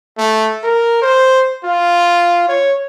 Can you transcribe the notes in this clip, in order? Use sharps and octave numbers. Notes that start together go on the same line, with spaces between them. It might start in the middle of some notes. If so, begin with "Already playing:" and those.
A3
A#4
C5
F4
C#5